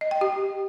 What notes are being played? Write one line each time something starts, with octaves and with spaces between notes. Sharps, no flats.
D#5
G5
G4